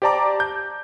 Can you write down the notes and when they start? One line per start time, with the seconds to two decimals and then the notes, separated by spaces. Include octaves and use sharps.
0.02 G4 C5 D5 A5 A#5 D6
0.40 G6